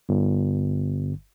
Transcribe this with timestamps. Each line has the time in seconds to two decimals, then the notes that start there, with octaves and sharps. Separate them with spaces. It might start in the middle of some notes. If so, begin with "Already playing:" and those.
0.09 G1